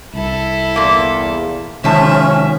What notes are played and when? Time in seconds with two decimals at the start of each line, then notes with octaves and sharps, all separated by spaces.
0.13 C2 E4 A4
0.76 E2 A#2 A#3
1.84 F#2 C3 D#3 F3 G#3 C#4 E5 A5